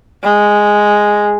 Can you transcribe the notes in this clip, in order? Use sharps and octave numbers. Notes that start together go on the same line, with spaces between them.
G#3